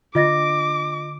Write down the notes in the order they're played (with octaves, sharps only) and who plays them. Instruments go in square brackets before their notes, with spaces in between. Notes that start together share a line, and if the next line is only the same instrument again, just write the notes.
[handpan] D3 [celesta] F4 D#5 A#6 [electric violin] D6